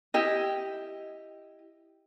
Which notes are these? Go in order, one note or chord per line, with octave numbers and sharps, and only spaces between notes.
E4 G4 D#5